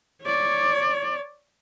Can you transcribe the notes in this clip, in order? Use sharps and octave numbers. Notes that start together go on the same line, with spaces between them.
C#5 D5